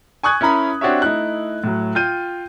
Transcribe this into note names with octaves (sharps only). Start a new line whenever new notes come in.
G#5 C#6 D#6 F#6 G#6
C#4 E4 A#4 A#5 B5
C4 D4 F#4 G4 C#5 E5
A3 D#4 E4 F#6
A2 F#3
F4 G5 G6 D#7